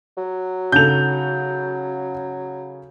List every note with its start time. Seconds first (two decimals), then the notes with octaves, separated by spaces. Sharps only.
0.17 F#3
0.72 C#3 D#4 A4 G6 F7